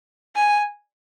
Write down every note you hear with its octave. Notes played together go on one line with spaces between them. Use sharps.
G#5